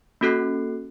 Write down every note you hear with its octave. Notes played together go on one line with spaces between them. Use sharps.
A#3 C#4 F#4 A4 F#6 C7